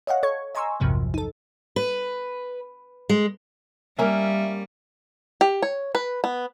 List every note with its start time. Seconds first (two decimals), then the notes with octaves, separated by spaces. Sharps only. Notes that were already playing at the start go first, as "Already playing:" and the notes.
0.07 C#5 D#5 F5 F#5
0.23 A4 C#5 C#6 G#6
0.55 D#5 G#5 A#5 C6 C#6 E6
0.80 A#1 E2 G2 C3 F3 F#3
1.14 D#4 A4
1.76 B4
3.09 G#3
3.99 G3 A#3 C#4 E5
5.41 G4
5.62 C#5
5.95 B4
6.24 B3